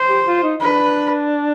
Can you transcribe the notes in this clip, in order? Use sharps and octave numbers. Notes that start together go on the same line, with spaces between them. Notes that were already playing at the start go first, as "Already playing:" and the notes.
Already playing: C5
G4
F4
D#4
D4 B4